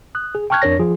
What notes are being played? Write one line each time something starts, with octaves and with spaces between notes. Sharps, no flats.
D#6 F#6
G#4
G5 A5 C#6 F6 F#6 G#6
F2 D4 A#4 C#5 A#6
F3 F4 G#4